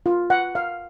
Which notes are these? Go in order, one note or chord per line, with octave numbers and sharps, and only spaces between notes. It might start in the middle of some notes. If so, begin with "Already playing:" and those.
F4
F#5
F5